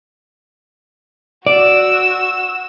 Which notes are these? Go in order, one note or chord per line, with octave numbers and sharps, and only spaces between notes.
F#4 D5 E6